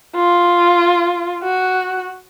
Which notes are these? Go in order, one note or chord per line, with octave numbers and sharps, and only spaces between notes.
F4
F#4